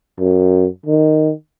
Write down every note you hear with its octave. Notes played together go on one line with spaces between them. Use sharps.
F#2
D#3